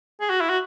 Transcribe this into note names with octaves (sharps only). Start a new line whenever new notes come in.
G#4
F#4
E4
F#4